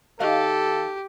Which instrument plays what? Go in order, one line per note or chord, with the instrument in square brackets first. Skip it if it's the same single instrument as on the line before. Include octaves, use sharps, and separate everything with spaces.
[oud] D#3 D#5 F5 [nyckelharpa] G4 [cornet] A4